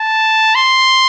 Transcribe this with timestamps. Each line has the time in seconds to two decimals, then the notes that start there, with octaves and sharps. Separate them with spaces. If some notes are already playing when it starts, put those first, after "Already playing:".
Already playing: A5
0.55 C6